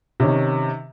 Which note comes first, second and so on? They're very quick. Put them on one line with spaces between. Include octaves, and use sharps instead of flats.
C3 C#4 D#3